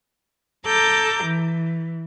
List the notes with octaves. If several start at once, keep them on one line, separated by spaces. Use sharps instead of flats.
A4 A#5 D6 G6
E3